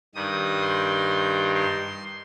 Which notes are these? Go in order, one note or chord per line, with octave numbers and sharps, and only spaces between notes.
G2 D#3 G3 D#6
C6
C6